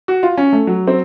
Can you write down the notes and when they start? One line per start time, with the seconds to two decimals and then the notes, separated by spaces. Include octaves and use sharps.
0.08 F#4
0.23 F4
0.38 C#4
0.53 A3
0.67 F#3
0.88 C4